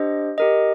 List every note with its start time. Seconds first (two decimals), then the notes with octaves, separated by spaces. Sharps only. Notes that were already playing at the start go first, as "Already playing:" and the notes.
Already playing: D4 G4 C5 D#5
0.38 G4 A#4 D#5